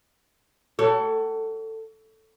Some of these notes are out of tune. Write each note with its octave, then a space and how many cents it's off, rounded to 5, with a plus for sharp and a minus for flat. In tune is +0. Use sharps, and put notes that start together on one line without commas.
F#4 +40 A4 +15 C#5 +0